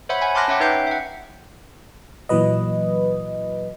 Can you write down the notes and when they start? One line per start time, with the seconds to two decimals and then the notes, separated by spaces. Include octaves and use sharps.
0.09 C5 C#5 E5 F#5 B5
0.21 F#5 G#5 B5
0.35 A5 C6 D6 F6 F#6 A#6
0.48 C#4 C#5 E5 F#5 G5
0.60 D#4 B4 E5 G5 G6 C7
0.87 E5 F#5
2.29 A#2 E3 F#3 B4 D#5